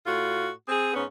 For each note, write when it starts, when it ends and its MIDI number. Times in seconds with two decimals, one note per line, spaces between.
0.07 0.49 45
0.07 0.49 65
0.07 0.49 66
0.68 0.92 60
0.68 0.92 68
0.94 1.04 44
0.94 1.04 59
0.94 1.04 61